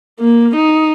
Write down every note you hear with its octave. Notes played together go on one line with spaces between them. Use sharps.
A#3
D#4